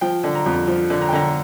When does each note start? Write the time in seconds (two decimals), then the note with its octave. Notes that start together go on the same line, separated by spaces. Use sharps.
0.01 F3 G5
0.24 D3
0.35 A#5
0.46 F2
0.67 F3
0.90 D3
1.02 A#5
1.09 G5
1.13 D3 A#5